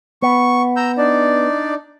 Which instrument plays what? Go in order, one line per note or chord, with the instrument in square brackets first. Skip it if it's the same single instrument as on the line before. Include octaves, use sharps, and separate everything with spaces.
[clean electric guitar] B3 [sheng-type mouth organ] C#6
[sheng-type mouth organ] A#5 E6 G6
D4 D#4 D5